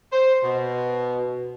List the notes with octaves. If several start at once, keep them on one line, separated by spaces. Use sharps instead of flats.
C5
B2